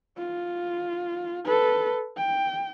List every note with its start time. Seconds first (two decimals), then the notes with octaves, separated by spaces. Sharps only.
0.17 F4
1.45 A4 B4
2.17 G5